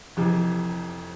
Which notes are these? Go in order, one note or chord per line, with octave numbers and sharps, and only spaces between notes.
F1 F2 C3 E3